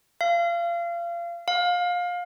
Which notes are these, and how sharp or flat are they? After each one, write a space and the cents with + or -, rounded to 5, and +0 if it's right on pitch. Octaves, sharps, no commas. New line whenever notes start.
F5 -30
F5 +25